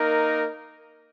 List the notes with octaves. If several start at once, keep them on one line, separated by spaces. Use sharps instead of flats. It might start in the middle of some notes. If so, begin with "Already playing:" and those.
Already playing: A#3 D#4 A#4